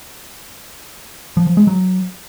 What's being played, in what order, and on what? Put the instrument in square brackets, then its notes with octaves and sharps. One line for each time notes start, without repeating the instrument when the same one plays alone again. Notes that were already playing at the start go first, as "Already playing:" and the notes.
[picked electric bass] F3
F3
G#3
F#3